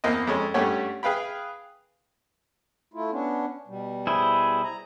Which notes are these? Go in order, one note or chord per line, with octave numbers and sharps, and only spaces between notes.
E2 A#3 C4 D#5
F2 G#3 C#4
G2 A3 C#4 G4 C#5 F#5
G#4 B4 F5 G5 B5
A3 E4 F4
B3 C#4 D4
B2 G3
E4 G#4 C5
A#5